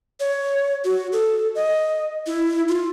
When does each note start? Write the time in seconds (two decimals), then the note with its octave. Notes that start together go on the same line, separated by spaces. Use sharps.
0.20 C#5
0.84 F#4
1.12 A4
1.55 D#5
2.26 E4
2.68 F4